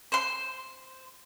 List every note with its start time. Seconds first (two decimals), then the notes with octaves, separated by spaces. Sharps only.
0.12 C5 C6